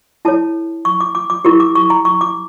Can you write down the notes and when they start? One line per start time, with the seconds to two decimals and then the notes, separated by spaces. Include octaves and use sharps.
0.25 E4 A4 C#5 A5
0.85 C#6
1.00 D6
1.15 D6
1.30 D6
1.45 E4 G4 A#4 C#6
1.60 D6
1.75 C#6
1.90 A#5
2.05 C#6
2.21 D6